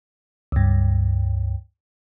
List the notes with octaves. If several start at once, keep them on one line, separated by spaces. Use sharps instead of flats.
C#2 G2